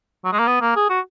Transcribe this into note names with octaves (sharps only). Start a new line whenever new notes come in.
F#3
G#3
A#3
B3
A#3
G#4
F#4